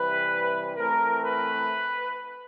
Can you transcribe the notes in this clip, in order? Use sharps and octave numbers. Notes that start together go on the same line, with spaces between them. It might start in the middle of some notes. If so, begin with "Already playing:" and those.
Already playing: C3 E3 G3 B4
E3 A3 C4 A#4
B4